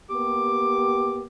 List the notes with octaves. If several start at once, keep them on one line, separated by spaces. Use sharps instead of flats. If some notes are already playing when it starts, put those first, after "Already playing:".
A#3 B3 G4 D6